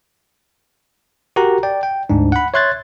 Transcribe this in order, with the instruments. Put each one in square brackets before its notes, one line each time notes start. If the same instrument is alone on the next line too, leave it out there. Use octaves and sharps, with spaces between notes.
[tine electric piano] F#4 G4 A#4 F#5 A#5
D5 G5
G5
D2 G#2 D4
F#5 B5
C#5 E5 C6 F#6 G#6 A6